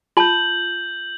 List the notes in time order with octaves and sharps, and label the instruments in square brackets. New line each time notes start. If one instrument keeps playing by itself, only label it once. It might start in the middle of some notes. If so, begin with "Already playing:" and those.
[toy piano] F4 A5 [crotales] G6 F#7